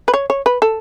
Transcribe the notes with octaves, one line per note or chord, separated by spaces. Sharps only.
B4
C#5
C#5
B4
A4